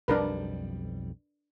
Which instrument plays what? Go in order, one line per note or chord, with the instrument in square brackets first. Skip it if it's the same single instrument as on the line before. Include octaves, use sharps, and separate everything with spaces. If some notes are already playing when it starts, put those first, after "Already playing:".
[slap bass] B1 F2 G3 [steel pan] D4 A#4 B4